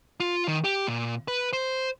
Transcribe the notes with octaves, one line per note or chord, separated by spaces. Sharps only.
F4
D#3
G4
A#2
B4
C5